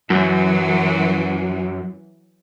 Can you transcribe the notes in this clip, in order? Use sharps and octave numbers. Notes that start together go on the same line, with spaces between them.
F#2 E3 F#3